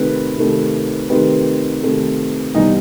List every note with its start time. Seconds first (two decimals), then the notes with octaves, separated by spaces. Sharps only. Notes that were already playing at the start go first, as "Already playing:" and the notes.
Already playing: C3 D#3 A3 C4 B4
0.37 C3 D#3 A3 C4
1.09 C3 D#3 A3 C4 B4
1.83 C3 D#3 A3 C4
2.55 C2 C3 E3 B3 D#4 D#5